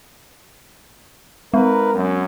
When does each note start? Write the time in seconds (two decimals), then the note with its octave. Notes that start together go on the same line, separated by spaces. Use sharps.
1.54 G#3 D#4 A#4 B4
1.94 F#2